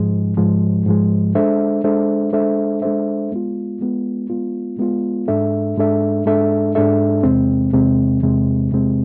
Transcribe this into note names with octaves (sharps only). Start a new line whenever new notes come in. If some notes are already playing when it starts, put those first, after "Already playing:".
Already playing: G#2 F3 G#3
G#2 F3 G#3
G#2 F3 G#3
G#3 D4 A4 C5 E5
G#3 D4 A4 C5 E5
G#3 D4 A4 C5 E5
G#3 D4 A4 C5 E5
G#3 B3 F4
G#3 B3 F4
G#3 B3 F4
G#3 B3 F4
G#2 G#3 D4 A4 E5
G#2 G#3 D4 A4 E5
G#2 G#3 D4 A4 E5
G#2 G#3 D4 A4 E5
E2 C3 G#3 C4
E2 C3 G#3 C4
E2 C3 G#3 C4
E2 C3 G#3 C4